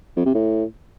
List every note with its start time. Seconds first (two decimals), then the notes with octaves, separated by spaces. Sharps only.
0.17 F2
0.25 C3
0.34 A2